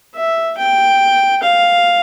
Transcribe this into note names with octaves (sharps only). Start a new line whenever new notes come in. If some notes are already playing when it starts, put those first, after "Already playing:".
E5
G5
F5